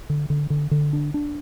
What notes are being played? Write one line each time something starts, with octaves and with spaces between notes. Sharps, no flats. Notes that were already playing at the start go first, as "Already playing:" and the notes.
D3
D3
D3
D3
D4
D4